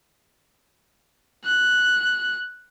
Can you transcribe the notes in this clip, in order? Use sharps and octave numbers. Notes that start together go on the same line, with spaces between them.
F#6